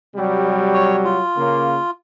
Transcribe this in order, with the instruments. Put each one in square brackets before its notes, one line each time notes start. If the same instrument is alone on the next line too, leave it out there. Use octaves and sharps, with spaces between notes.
[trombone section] C3 F#3 G3
[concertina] C#5
F4
[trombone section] C#3 A#3